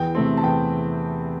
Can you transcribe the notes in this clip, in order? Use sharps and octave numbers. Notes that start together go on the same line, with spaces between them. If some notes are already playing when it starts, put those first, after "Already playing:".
Already playing: E2 G5
C3 A3 C4
A5
E2 G5